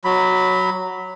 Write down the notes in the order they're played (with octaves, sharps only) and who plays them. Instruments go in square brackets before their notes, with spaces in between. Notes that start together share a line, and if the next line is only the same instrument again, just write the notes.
[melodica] F#3 B5